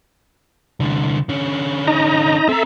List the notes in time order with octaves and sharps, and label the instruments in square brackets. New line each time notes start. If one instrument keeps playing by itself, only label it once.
[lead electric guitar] C2 D3
D3 C#4
[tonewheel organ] D#4 D#5 A#5
[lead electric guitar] C4 A#5 [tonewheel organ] A4 E5